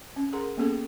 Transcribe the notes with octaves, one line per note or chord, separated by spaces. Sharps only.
C#4
G#4 A#4 F#5 A#5 C6
A#3 B3 C#4 G#4 A4